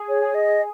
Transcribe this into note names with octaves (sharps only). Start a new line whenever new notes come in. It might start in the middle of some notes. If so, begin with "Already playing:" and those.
Already playing: G#4
C#5
G#4
D#5